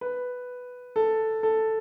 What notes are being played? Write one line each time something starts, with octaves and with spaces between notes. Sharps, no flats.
B4
A4
A4